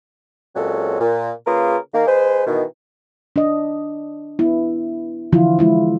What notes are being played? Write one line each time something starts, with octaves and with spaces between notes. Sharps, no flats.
A#2 F#3 G#3 C4 C#4 A4
A#2
C#3 A#3 F4 G#4 A#4 B4
D#3 A#3
G#3 G#4 B4 C5
B2 D#3 E3
D4 D#5
B3 E4
D3 E3 F3 E4 F4
G#3 E4 F4